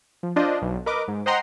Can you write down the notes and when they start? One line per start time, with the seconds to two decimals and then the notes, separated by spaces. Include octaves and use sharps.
0.23 F3
0.36 D4 F4 C5 D#5
0.62 B1
0.86 A#4 B4 D#5 D6
1.08 G#2
1.26 C5 D#5 F#5 G5 A#5 C6